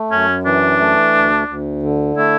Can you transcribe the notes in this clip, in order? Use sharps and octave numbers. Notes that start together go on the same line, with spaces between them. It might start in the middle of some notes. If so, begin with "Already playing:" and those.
Already playing: A3
F#2 C#4
E3 D4
A3
D2
D2
D3
A3 E4